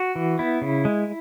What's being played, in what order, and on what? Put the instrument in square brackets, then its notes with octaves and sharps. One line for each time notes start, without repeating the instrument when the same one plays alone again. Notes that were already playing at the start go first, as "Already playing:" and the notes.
Already playing: [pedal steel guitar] F#4
E3
B3 E4
C#3
G#3